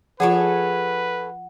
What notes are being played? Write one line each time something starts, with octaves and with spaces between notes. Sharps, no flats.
F3 F4 G#4 A4 B4 C#5 F#5